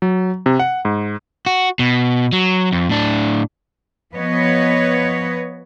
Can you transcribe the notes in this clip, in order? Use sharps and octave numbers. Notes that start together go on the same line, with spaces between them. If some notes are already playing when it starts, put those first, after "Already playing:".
F#3
C3
F#5
G#2
F#4
B2
F#3
F2
A2 D4
F3 B3 B4 C#5 D#5